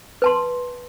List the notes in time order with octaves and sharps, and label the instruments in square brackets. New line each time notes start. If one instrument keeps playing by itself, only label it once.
[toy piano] B4 A5 C6